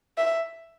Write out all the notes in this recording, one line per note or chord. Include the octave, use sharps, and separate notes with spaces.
E5